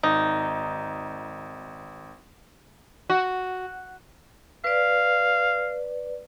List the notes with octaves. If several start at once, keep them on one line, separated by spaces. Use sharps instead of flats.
G#1 D#4
F#4
B4 D5 F5